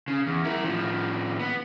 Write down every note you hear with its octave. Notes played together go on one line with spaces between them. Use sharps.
C#3
E2
E4 A#4
A2 F3
B3